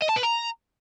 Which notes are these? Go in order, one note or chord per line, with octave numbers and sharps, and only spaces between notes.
D#5
A5
B4
A#5